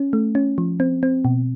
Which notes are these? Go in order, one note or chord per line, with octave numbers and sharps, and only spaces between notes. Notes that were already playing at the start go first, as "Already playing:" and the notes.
Already playing: C#4
A3
C#4
F3
C4
C4
B2